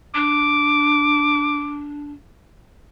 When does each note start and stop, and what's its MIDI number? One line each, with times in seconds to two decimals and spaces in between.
0.15 2.12 62
0.15 1.83 86